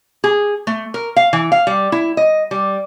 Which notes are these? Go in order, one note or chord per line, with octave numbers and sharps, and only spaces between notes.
G#4
A3
A#4
F5
E3
F5
G3
E4
D#5
G3